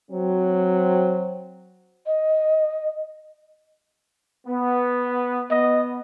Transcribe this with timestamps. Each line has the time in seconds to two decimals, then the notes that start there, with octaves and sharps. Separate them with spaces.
0.11 F#3 C4
2.06 D#5
4.47 B3
5.50 B3 D#5